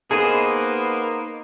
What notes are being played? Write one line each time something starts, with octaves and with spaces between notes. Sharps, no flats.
A#3 B3 D#4 G#4 C5 D#5